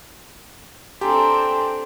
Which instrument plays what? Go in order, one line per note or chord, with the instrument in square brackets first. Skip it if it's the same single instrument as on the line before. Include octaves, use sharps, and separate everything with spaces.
[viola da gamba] C4 D4 [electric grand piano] G4 [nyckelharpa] A4 [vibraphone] G#5 A#5 C6